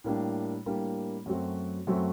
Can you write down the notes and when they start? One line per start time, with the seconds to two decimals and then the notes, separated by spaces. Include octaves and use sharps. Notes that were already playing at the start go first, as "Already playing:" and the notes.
0.04 A2 G3 A#3 D4
0.66 A2 G3 A#3 D4
1.26 F#2 F#3 A3 C4 F#4
1.87 F#2 F#3 A3 C4 F#4